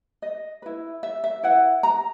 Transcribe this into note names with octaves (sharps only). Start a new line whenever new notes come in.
D#5
E4 B4
E5
E5
E4 B4 F#5
A#5